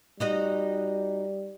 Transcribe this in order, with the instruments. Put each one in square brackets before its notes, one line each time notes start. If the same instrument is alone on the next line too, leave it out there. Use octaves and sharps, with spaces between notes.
[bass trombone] G3 [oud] D#4 F#4 D#5